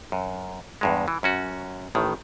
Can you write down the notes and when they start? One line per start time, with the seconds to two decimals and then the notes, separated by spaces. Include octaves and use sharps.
0.12 F#2
0.81 E2 G2 G#3
1.08 E3
1.23 F#2 C#4 F#4
1.95 A1 A2 D#3